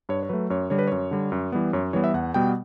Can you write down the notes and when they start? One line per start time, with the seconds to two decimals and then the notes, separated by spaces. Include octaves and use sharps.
0.09 G2 C#5
0.23 C#5
0.29 F#3 A3 B4
0.50 F#2 C#5
0.70 D3 G3 C#5
0.79 B4
0.87 F#2 C#5
1.11 D3 G3
1.32 F#2
1.52 E3 G3 B3
1.73 F#2 C#5
1.93 E3 G3 B3 C#5
2.04 E5
2.14 E2 F#5
2.34 B2 G3 B3 G5